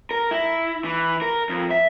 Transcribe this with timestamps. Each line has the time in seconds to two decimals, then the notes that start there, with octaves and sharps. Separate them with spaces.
0.11 A#4
0.31 E4
0.85 E3
1.22 A#4
1.49 F2
1.71 E5